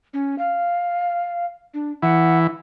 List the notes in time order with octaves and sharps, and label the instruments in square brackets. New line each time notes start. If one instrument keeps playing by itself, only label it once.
[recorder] C#4
F5
D4
[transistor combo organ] E3 [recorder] F#5